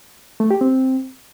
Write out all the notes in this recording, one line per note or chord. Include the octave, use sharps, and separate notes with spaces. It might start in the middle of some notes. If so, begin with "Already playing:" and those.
A3
G4
C4